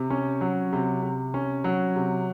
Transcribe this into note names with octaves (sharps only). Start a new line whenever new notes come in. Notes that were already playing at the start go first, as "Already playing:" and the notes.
Already playing: C3
C#4
F#3
C3
C3
C#4
F#3
C3